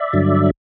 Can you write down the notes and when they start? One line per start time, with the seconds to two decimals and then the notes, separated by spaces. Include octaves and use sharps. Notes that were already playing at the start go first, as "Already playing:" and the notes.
Already playing: D5 E5
0.13 G2 D3 F#3